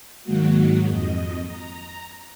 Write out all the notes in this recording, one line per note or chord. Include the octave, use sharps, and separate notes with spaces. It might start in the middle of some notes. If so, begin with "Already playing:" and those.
G#2 D#3 F#3 G#3 A#3 F#4
F2 D#5
A#5